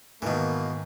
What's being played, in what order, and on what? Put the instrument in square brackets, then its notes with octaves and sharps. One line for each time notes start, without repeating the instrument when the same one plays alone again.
[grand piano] G#2 D#3 [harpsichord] B2 E3 [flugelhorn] A#3